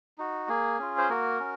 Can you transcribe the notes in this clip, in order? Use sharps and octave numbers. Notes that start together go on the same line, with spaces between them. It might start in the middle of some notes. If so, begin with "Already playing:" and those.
D#4 F#4
A#3 G#4
C#4 F4
C5
A#3 F#4 A#4
C#4